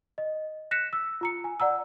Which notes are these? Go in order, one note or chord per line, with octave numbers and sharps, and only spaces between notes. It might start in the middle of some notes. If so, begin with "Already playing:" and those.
D#5
F#6 A#6 B6 C#7 E7
E6
F4 A#5 C#7
G#5
D5 F#5 A#5 E6